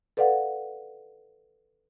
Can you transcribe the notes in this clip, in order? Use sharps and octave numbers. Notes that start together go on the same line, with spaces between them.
A4 B4 D5 F5 F#5